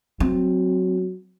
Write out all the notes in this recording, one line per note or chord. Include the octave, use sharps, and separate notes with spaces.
F#3 C4